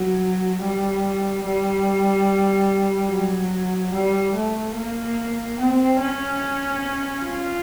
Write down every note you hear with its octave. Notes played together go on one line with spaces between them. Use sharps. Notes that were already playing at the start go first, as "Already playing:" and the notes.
Already playing: F#3
G3
G3
F#3
G3
A3
A#3
C4
C#4
F4